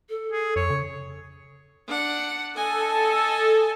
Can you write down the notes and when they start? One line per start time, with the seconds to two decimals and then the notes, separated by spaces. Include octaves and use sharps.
0.09 A4
0.32 G#4
0.56 F2 C#5
0.70 C#3
1.87 D4 F#5
2.54 A4 D#5 G#5
2.87 A4